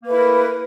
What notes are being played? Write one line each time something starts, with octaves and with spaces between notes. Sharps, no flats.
A3 A#3 E4 A#4 B4